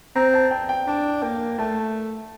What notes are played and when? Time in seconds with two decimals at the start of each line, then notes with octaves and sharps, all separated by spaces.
0.16 C4 A#5
0.34 A5
0.51 G5
0.69 G5
0.87 D4 A5
1.22 A#3 G5
1.59 A3 A5